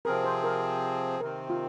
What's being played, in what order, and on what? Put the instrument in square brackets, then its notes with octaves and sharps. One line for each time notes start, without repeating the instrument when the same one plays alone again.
[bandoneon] C3 F3 C4 G#4 [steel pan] A#4
[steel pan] C5
A#4
[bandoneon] C3 D#3 C4 [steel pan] A#4
[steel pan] F4